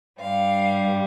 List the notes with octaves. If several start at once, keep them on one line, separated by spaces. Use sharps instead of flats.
G2 G3 F5